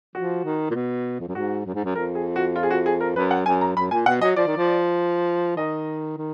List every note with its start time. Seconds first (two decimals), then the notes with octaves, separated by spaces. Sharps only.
0.15 F3 F#4
0.45 D#3
0.70 A#2
0.74 B2
1.20 F2
1.28 F#2
1.35 G#2 F#4
1.66 F#2
1.75 G#2
1.85 F#2
1.95 F2 A#4
2.15 G#4
2.36 F#4
2.56 F4
2.63 G#4
2.71 F#4
2.86 G#4
3.01 A#4
3.16 F#2 B4
3.31 F#5
3.46 F#2 G#5
3.61 A#5
3.76 F#2 B5
3.91 A#2 G#5
4.06 B2 F#5
4.21 F#3 D#5
4.36 F3 D5
4.47 D#3
4.57 F3
5.56 D#3 D#5
6.18 D#3